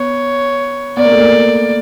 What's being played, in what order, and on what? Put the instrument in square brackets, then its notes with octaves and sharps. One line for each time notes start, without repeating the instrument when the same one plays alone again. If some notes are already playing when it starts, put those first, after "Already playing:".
Already playing: [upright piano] B3 [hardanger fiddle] C#5
[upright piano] B3 [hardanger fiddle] D5
[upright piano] A#3
A3
A#3